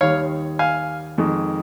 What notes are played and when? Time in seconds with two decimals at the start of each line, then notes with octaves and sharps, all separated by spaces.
0.01 D#2 D#3 G3 C#5 F5
0.59 F5 G#5
1.18 F2 D#3 G#3